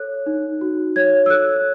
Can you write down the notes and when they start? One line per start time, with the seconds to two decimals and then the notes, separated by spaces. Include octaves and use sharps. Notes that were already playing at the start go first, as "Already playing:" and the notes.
Already playing: A4 C#5 F#6
0.26 D#4
0.61 F#4
0.96 C#5 G#6
1.26 E6
1.30 A4 F#6